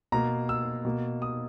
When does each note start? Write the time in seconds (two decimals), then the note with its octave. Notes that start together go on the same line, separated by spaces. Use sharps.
0.12 B2 A#3 A#5
0.49 E6
0.85 B2 A#3
1.22 D#6